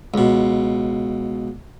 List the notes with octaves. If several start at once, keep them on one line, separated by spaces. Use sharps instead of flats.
C#2 B2